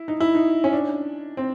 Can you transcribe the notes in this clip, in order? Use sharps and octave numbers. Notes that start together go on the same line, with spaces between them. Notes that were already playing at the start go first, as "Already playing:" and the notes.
Already playing: E4
D#4
E4
D#4
C#4
D4
C4